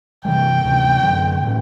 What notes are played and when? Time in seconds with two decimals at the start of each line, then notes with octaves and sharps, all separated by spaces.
0.25 C3 E3 G3 G5
0.64 D2 C3 E3
1.03 F#2 D3 F#3
1.43 A2 F#3 A#3 C#4